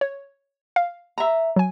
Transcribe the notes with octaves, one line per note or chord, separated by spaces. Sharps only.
C#5
F5
E5 A#5
F#3 G#5